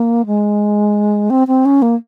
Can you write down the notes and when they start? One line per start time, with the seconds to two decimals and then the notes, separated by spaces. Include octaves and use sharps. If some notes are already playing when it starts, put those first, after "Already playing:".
Already playing: A#3
0.26 G#3
1.30 C4
1.47 C4
1.65 C#4
1.82 A#3